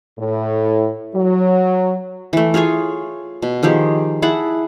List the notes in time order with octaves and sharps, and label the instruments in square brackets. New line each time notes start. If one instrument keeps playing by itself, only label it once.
[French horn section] A2
F#3
[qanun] E3 A3
F4 G#4 C#5 G#5
B2
D#3 F3 G4 G#4
E4 G#4 F#5 A5